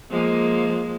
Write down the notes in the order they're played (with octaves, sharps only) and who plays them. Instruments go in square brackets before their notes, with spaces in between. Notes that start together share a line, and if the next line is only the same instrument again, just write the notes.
[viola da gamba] F3 G#3 A#3